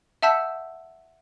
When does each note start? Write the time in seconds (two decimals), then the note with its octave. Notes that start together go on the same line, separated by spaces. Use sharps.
0.22 E5 F#5 A5 E6 G6 B6